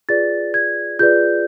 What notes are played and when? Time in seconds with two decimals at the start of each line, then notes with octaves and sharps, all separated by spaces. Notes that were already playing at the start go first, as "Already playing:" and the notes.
0.09 F4 G#4 B4 D5 A6
0.54 G#6
0.99 F4 G#4 B4 D5 G6